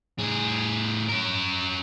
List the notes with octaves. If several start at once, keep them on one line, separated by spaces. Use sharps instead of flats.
A2 G#4
C#4 A#4